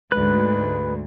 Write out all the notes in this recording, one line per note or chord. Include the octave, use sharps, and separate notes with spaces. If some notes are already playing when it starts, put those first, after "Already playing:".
D2 G#2 B4 F#6